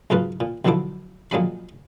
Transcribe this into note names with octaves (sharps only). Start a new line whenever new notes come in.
B1 G#2 C#3 A#3 F4 B4
A#2
B1 B2 D3 F3 E4 D6
A#2 F3 F#3 G#3 G#5 B5